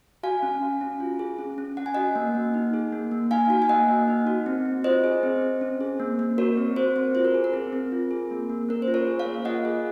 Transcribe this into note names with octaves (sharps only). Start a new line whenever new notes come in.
F#4 F5 G#5
C#4
F#4
C#4
F4
G#4
C#4
C#4
C#4 F#5
G#5
F#4 D#5 F#5
A#3
A#3
D#4
G#4
A#3
A#3
D#4 F5 G#5
F#4
G#5
A#3 D#5 F#5
A#3
D#4
F#4
C4
C4
F4 C5 D#5
G#4
C4
C4
C#4
G#4
A#3
A#3
F#4 A#4 C#5
C4
F#4 C5
C4
F4 C5
A#4
G#4
A#4
C4
C4
F4
G#4
A#3
A#3
C#4 A#4
C5
F4
A#4 C#5
G#4
C#5 F5
A#3
F4 D#5 F#5
G#4